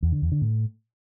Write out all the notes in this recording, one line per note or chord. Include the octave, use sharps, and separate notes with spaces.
E2
D3
E2
D3
A2